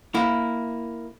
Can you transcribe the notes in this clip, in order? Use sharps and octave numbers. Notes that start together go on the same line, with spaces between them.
A#3 E4